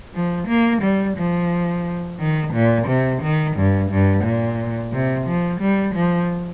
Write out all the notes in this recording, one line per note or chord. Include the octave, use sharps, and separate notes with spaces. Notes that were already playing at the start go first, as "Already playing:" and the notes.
F3
A#3
G3
F3
D#3
A#2
C3
D#3
G2
G2
A#2
C3
F3
G3
F3